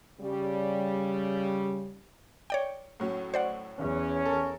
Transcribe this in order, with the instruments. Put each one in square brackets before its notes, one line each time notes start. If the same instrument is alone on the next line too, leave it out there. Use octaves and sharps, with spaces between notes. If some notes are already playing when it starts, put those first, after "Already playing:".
[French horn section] C#3 G3
[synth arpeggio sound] C#5 D5 G5
[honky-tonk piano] A2 F#3 C#4
[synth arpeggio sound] C5 D5 F#5
[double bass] E2 [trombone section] C#4
[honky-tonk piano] A4 A#4